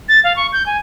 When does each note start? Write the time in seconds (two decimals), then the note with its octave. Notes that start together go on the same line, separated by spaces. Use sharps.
0.09 A6
0.24 F5
0.36 C#6
0.53 G6
0.66 G#5